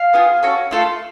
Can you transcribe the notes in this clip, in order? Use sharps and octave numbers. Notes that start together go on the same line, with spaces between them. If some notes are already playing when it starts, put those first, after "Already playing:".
Already playing: F5
B3 F4 G#4
C#4 F#4 A4
A3 F4 A4